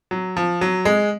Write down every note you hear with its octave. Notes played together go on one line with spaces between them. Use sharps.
F#3
F3
F#3
G#3